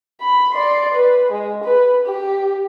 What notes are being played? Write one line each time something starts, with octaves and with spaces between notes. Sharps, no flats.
B5
D5 C6
B4
G#3
B4
G4